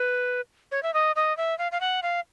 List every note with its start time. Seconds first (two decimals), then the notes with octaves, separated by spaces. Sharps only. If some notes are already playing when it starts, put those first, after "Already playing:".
Already playing: B4
0.71 C#5
0.83 E5
0.94 D#5
1.16 D#5
1.37 E5
1.58 F5
1.72 F5
1.80 F#5
2.02 F5